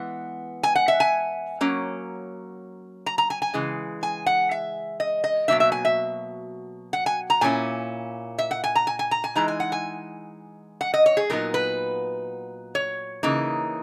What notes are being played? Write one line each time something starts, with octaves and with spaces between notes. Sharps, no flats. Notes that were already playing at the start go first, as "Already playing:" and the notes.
Already playing: E3 G#3 B3 F#5
G#5
F#5
E5
G#5
F#3 A#3 C#4
A#5
A#5
G#5
G#5
C#3 E3 G#3
G#5
F#5
E5
D#5
D#5
B2 F#3 A#3 D#4 E5
E5
G#5
E5
F#5
G#5
A#5
A#2 A#3 C#4 E4 G#5
E5
F#5
G#5
A#5
G#5
G#5
A#5
G#5
E3 G#3 D#4 A#5
G#5
F#5
G#5
F#5
D#5
C#5
G#4
A#2 F#3 B3 D#4 A#4
B4
C#5
C#3 E3 A#3 D#4